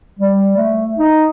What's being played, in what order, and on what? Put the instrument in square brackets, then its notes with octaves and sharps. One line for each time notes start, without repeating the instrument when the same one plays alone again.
[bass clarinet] G3
A3
D#4